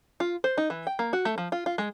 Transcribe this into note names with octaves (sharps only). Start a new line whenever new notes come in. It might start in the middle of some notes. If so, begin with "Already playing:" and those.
F4
C5
D#4
E3
G5
A#3
F#4
A3
F3
F4
F4
G#3